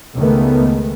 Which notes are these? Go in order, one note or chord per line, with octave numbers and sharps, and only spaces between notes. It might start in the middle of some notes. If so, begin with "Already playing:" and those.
C#2 D#3 G#3 A3 B3